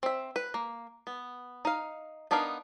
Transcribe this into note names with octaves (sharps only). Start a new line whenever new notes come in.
C4 E5
B4
A#3
B3
D#4 F5
B3 D4 D#4 A#4 F5